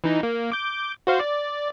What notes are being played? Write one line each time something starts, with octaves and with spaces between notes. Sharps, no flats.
E3 D#4
A#3
D6 G6
F#4 C5 F5
D5